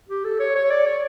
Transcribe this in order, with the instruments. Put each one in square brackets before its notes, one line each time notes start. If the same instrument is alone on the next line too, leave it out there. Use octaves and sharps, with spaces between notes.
[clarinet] G4
A4
C#5
C#5
D5
C#5